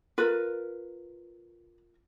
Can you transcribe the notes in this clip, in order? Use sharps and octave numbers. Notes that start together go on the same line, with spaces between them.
F4 A#4 B4